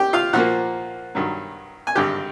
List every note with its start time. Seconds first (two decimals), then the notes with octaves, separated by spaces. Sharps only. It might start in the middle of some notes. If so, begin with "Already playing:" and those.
Already playing: G4 G5
0.13 F4 F5
0.33 A#2 F3 A#3 F#4 F#5
1.15 G2 D#3 F#3
1.87 G#5
1.95 G#1 G2 D3 G4 G5